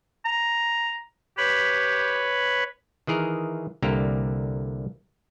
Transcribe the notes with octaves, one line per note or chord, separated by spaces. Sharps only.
A#5
G4 B4 C#5 B5
D#3 E3 G#4 A#4
C2 D3 A#3 G4 A#5